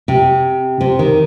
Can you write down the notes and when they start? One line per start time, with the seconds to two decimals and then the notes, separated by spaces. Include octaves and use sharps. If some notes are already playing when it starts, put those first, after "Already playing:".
0.08 C3
0.81 C3
0.99 D#3